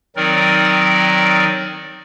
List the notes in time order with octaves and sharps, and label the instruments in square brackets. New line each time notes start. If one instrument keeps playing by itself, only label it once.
[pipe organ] D#3 F#3 C4 D#4 A#4 D5